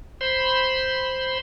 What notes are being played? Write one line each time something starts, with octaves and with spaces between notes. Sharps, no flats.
C5 B5 C6